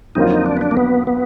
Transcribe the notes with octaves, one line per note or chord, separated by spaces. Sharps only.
F2 D3 F#3 A#3 D#4 F4
D#4
D4
B3
D4
A#3
B3
B3